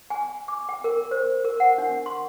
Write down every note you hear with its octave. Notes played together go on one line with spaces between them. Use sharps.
G#5
D6
G5
A#4
C5
A#4
F#5
D4
C6